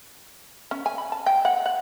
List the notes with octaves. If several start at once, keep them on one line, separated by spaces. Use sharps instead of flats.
C#4
G#5
B5
A5
G5
F#5
F#5